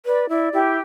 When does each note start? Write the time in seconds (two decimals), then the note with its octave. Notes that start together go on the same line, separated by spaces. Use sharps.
0.05 B4 D5
0.29 E4 D5
0.53 E4 G4